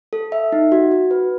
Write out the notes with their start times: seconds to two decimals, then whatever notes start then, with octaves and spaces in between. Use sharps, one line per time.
0.13 A4
0.32 E5
0.52 D#4
0.72 F#4
0.92 F#4
1.11 B4